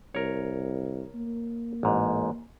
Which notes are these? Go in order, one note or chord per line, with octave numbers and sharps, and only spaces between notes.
C2 A#4 C#5
A#3
A1 G#2